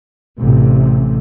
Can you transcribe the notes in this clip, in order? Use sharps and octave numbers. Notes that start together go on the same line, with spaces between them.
A1 C3